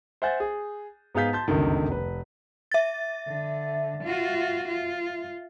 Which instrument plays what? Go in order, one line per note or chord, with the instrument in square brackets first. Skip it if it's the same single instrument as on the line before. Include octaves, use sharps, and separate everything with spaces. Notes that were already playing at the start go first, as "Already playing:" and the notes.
[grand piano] C5 E5 F#5 G#5 G6 A6
G#4
G#2 B3 G#4 F5 G6 B6
A5 C6 G6 A6
G1 C#2 F#2 D3 D#3
F1 B4
[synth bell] E5 A6
[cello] D3
F4 F#4
F4